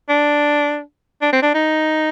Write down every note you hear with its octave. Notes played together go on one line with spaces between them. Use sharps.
D4
D4
C4
D4
D#4